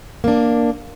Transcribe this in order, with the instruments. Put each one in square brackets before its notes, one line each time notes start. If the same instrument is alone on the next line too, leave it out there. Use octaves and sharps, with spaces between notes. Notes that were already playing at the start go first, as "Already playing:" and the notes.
[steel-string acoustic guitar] A#3 D4